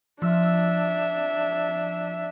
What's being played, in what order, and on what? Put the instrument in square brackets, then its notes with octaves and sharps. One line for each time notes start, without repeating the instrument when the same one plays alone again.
[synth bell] F3 E6 [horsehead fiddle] D4 E5